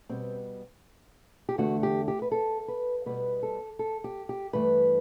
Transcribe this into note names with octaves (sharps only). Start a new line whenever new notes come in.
B2 G3 B3 C4
G4
E2 D3 A3 F#4
G4
G4
B4
A4
B4
B2 G3 B3 B4
A4
A4
G4
G4
G2 E3 A3 B4